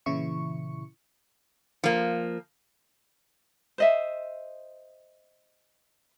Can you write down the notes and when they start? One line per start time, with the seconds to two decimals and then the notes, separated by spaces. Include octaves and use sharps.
0.06 A#2 C#3 E3 E4 C#6 C#7
1.84 F3 A#3
3.78 C5 D#5 E5